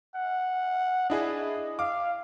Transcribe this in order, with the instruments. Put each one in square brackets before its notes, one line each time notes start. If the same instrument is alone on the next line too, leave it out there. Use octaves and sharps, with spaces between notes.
[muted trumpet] F#5
[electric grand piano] D4 E4 G#4 [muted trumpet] D#5
[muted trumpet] F5 [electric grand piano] D6